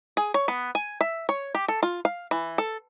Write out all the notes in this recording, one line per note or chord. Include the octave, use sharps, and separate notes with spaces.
G#4
C#5
B3
G#5
E5
C#5
G4
A4
F4
F5
E3
A4